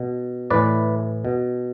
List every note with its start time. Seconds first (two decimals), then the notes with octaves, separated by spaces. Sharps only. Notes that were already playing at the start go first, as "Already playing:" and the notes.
Already playing: B2
0.50 A2 E3 B4 D5
1.25 B2